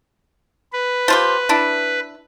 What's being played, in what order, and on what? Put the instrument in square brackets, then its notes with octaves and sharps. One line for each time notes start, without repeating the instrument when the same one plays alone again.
[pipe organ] B4
[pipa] F3 F4 G4
D4 E4